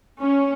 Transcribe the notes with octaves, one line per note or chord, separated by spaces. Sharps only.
C#4